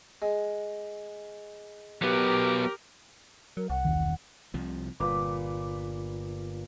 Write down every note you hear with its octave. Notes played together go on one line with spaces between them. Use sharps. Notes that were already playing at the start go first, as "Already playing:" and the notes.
G#3
F#3 B3 G4 A#4
F#3 A#4
C2 F#5
E1 D#3
C2 C3 F3
G1 A#2 B4 D6